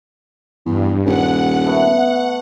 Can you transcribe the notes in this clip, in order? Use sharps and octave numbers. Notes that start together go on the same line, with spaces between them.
E2 G2
D#1 F#5
A3 B3